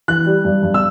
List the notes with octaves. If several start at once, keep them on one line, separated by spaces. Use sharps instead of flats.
E3 F#6
G3
G2
G2
E6